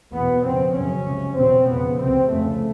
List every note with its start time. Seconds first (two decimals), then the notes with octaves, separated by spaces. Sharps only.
0.14 E2 B2 B3
0.45 F2 C#3 C4
0.76 F#2 C#3 C#4
1.07 C#2 C3
1.38 E2 B2 C4
1.69 F2 C#3 B3
2.00 C#2 C3 C4
2.31 F2 C#3 A3